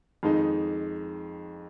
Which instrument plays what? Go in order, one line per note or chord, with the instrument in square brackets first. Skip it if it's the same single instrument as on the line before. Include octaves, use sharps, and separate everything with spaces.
[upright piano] F2 D#3 G#3 D#4